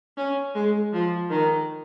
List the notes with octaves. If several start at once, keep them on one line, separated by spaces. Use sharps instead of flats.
C#4
G#3
F3
D#3